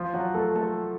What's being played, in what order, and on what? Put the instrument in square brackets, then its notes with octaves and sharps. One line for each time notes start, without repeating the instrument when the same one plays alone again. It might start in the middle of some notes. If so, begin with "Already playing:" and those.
Already playing: [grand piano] F3 F4
F#3 F#4
A3 A4
A3 A4